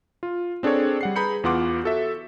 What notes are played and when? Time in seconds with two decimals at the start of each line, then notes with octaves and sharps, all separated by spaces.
0.23 F4
0.63 C4 D4 G#4 A4 C#5
1.01 G3 F#5 C7
1.16 G#4 B4 A#5 B5 G6 C#7
1.44 E2 B3 F4 F#5 C6 D6
1.84 F#4 A4 E5